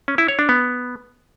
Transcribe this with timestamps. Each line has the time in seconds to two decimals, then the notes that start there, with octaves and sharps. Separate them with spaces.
0.08 C#4
0.18 E4
0.28 C#5
0.39 D4
0.49 B3